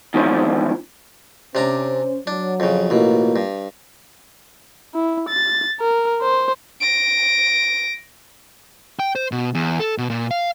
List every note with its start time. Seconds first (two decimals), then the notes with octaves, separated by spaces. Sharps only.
0.14 E2 G#2 D#3 F3 C#4
1.55 C3 C#4 D4 C5 A#5
2.27 F#3 D4
2.60 F2 C#3
2.90 A1 B2 A#3 F4
3.36 G2
4.94 E4
5.29 A6
5.80 A#4
6.21 C5
6.81 A#6 D7
8.99 G5
9.15 C5
9.32 B2
9.55 E2
9.80 A4
9.98 B2
10.10 A#2
10.31 F5